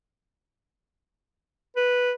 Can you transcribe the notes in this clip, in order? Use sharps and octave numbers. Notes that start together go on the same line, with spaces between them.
B4